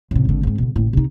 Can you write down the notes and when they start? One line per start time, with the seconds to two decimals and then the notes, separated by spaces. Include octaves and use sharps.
0.11 A1 C3
0.25 G#1 D3
0.43 G#2 C4
0.58 B2 D3
0.76 A1 A2
0.93 C3 D#4